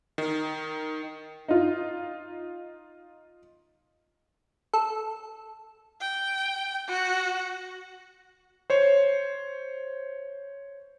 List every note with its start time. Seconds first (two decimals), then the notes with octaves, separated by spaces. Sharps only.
0.18 D#3
1.49 D#4 F4
4.74 A4
6.01 G5
6.87 F#4
8.70 C5 C#5